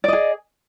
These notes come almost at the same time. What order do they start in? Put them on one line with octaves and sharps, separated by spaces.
D5 D#5 G#4